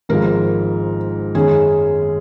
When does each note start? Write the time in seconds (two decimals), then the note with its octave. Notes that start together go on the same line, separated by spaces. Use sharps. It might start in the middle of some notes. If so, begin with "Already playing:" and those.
0.09 G#1 G#2 F3 A#4
1.35 F#2 D#3 G#3 C#4 G#4